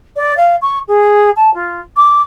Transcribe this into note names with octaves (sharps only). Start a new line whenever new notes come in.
D5
F5
C#6
G#4
A5
F4
D6